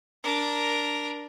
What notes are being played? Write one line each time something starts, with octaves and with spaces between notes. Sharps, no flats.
D4 A#4